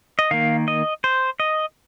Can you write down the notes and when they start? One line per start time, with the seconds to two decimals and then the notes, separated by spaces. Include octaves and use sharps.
0.19 D#5
0.31 D#3 A#3 F5
0.68 D#5
1.04 C5
1.40 D#5